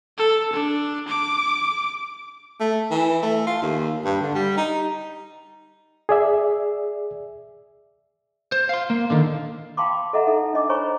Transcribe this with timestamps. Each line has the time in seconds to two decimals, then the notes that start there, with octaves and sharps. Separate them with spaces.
0.18 A4
0.53 D4
1.08 D6
2.60 A3
2.91 E3
3.23 A3
3.47 F4
3.62 D#2
4.05 G2
4.21 D3
4.35 G3
4.57 D#4
6.09 G#4 D5 E5
8.52 C5
8.69 F5 C6
8.90 A#3
9.10 D3 D#3
9.77 F5 G5 A5 B5 C6 D6
10.13 A4 D#5 E5 F#5 A#5
10.27 D#4 A4 D#5
10.54 D4 D#5 D6
10.70 C5 C#5 G#5 A#5 B5 C#6